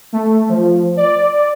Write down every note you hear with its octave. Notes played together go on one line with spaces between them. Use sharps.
A3
F3
D5